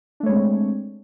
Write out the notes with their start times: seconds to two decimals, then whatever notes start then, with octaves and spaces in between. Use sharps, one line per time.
0.20 D4
0.23 A3
0.26 C#5
0.29 G#3
0.32 C4